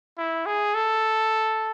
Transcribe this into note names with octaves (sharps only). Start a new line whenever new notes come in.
E4
G#4
A4